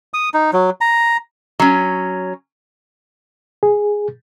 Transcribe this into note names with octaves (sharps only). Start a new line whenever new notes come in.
D#6
D#4
F#3
A#5
F#3 C#4
G#4